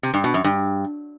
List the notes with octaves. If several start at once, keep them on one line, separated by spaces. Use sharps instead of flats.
C3
G2
B2
F#2
G2